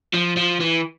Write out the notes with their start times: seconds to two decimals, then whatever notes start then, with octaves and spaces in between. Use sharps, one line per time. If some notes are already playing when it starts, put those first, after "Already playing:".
0.14 F3
0.37 F3
0.61 E3